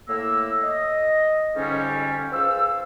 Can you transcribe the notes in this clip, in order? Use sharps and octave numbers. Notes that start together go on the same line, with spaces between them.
A2 A#3 E6
D#5
F2 G#2 D3 G3 C#4
C#2 C5 F5 E6